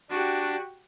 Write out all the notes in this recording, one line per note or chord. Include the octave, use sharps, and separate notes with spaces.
D4 F#4 G4